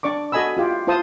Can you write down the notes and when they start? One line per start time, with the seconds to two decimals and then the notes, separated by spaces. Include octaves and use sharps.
0.03 D4 D5 C#6 D6
0.32 F#4 A4 D#5 G#5 B5 E6
0.57 E4 F4 G4
0.87 E4 F4 C5 A5 D#6